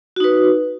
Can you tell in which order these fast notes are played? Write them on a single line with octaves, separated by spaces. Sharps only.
F#4 D#4 B4